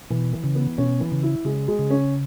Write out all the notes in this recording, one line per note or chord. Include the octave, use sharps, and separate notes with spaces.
B2 E3
E3
C#3
B3
B2 C#4
E3
C#3
E4
C#3 G#3
G#3
C#3
C#4